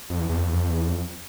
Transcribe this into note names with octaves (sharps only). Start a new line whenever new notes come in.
F2
E2
E2
F2
E2
F2
E2
F2